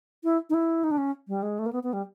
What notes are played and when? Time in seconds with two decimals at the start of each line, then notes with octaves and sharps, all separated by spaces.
0.24 E4
0.50 D#4
0.54 E4
0.84 D#4
0.91 D4
0.98 C#4
1.28 G3
1.43 G#3
1.59 A3
1.66 A#3
1.73 B3
1.83 B3
1.93 G3